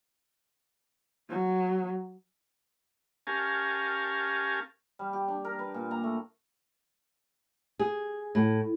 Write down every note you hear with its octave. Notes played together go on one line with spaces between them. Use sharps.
F#3
C#4 G4 A#4 F5 G#5 A5
G3
G4
D4
A#4
B4
A#2
A#5
A3
G#4
A2